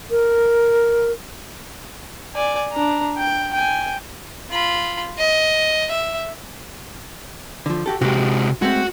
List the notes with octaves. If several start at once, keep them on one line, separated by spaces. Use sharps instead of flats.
A#4
D5 G#5
D4 A#5
G5
G5 G#5
F4 B5
D#5
E5
D3 F3
F#4 G4 A4
C3 G#3 F#4 G4
G#3 A3 C4 F#4